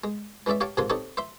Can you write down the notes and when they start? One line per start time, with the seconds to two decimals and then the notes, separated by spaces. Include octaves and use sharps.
0.04 G#3
0.46 E3 G#3 C#4 D5 E5
0.61 G4 C#5 F5 G5 A5
0.77 G#2 C3 F3 A#3 G#5 C6
0.90 C4 D#4 G4 A4 C#5
1.17 C5 E5 C6